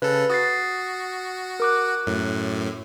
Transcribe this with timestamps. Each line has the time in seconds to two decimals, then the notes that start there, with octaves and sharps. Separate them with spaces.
0.02 C#3 A4 B4
0.30 F#4 D#6 A6 C7
1.60 A#4 D6 F#6
2.06 F#2 A2